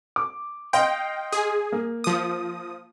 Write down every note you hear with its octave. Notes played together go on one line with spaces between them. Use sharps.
D6
D#5 F5 G5 C6
G#4
A#3
F3 D#6